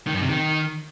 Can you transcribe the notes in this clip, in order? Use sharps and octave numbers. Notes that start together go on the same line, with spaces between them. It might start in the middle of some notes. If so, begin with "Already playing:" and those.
D#3
F#2
C3
D#3